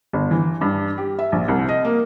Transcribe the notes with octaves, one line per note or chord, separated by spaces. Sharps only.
G1
E3
G2
G4
E5
A#1
C2
D#5
A#3